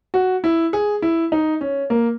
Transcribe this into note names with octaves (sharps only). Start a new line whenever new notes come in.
F#4
E4
G#4
E4
D#4
C#4
A#3